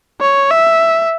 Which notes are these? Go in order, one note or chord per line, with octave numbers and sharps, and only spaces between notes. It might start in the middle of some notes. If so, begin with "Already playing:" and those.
C#5
E5